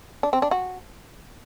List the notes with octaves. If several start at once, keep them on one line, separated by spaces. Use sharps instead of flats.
D4
C4
D4
F#4